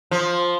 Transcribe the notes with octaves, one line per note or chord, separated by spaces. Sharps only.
F3